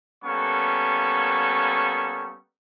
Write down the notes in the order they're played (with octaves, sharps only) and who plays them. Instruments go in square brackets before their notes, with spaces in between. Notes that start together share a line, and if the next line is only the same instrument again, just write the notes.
[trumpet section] G3 A#3 B3 C#4 A4 C#6